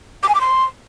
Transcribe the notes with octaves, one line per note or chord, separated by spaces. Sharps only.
D6
G#5
D6
C6